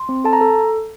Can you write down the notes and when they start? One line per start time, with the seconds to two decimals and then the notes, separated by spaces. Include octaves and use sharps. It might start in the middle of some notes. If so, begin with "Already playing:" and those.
Already playing: C6
0.09 C4
0.24 A4 A5
0.33 A#5
0.41 A4